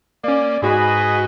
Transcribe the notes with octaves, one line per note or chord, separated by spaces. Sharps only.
A#3 C#4 D5
G#2 F#4 G#4 B4 D#5 B5